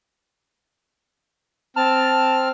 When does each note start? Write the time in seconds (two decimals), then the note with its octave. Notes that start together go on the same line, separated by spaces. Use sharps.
1.76 C4 A5 F6